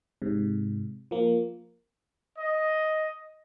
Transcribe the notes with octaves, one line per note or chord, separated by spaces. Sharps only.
G#2 C3
F3 A#3
D#5